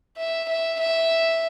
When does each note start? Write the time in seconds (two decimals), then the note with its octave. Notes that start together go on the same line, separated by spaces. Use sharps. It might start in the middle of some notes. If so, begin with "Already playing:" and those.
0.17 E5
0.49 E5
0.80 E5